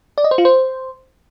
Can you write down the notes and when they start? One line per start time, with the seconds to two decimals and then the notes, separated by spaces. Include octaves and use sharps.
0.18 D5
0.24 D#5
0.31 C5
0.38 F4
0.45 C5